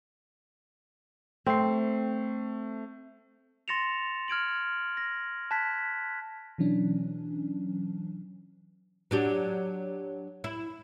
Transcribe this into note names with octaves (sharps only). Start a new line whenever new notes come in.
A3 C4 C7
C6 A6 A#6 C#7 E7 F7
F6 G#6 D7 F#7
A#6
A5 F#6 G#6 B6
B2 E3 F#3 C#4 D4
F#3 D4 G4
E4